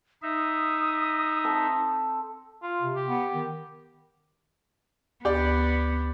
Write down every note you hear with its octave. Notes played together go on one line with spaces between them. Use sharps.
D#4 E5 D#6
C4 A4
F4
C3
G4
B3
D#3
D2 B3 G4 D5